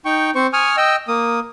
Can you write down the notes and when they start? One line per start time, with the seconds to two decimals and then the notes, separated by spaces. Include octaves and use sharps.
0.05 D#4 G5 C#6
0.35 C4 C5 C#6
0.53 G#5 C#6 D#6 F6
0.77 D#5 G5 E6
1.08 A#3 D#6